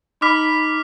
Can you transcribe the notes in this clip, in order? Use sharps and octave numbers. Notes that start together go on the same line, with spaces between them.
D#4 B5 D6 F6 B6